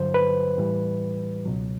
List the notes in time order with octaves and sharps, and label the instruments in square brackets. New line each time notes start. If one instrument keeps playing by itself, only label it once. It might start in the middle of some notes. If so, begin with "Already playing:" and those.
Already playing: [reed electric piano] G2 D3 F#3 C5
B4
A2 E3 G3
C#2 B2 F#3